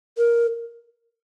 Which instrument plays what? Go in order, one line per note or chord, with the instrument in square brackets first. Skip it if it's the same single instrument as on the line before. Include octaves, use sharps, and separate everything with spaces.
[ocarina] A#4